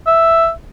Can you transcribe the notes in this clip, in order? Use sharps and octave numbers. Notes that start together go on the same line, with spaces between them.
E5